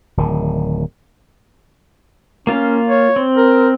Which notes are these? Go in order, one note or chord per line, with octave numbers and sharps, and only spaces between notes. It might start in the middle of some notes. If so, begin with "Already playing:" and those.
D1 D#3
A#3 C#4 F4 F5
C#5
C4
A#4